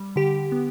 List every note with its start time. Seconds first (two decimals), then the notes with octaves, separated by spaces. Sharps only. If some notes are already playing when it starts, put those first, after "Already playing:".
Already playing: G3
0.16 D3 G4
0.52 B3